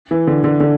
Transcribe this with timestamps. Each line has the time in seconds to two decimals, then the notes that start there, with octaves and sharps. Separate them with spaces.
0.11 E3
0.27 D3
0.44 D3
0.60 D3